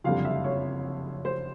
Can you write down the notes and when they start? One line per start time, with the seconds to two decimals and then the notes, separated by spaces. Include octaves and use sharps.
0.04 F#1 F2 D3 G3 F5
0.25 E5
0.44 C#5
1.25 C5